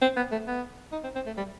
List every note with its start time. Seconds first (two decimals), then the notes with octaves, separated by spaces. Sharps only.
0.02 C4
0.16 B3
0.32 A3
0.47 B3
0.92 D#4
1.03 C4
1.15 C4
1.26 A3
1.37 G3